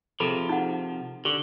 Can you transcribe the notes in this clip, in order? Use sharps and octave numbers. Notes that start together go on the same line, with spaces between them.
C3 F3 G#4 A4 B5
D#4 F#5
D3 G4